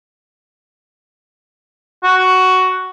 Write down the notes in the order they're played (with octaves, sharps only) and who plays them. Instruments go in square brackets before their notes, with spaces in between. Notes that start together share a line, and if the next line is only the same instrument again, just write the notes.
[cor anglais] F#4